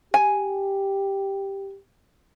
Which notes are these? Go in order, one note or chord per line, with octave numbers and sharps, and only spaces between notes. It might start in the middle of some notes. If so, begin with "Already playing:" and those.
G4 G#5